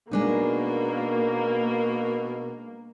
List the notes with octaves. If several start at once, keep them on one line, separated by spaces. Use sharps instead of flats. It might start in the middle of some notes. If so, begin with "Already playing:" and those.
B2 G#3 A#3 D4 D#4